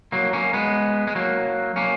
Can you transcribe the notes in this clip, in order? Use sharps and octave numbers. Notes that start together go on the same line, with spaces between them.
F#3 A#3
A#3 C#4
G#3 B3
G#3
F#3 A#3
A#3 C#4